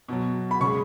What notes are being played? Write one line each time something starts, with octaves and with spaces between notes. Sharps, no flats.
B2 F#3
B5
C#3 G#3 C#6